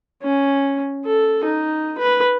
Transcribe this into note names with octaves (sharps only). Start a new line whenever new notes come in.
C#4
A4
D#4
B4